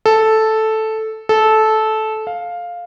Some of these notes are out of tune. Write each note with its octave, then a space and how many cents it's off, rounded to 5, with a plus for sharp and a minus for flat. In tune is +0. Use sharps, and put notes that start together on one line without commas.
A4 -5
A4 -15
F5 +5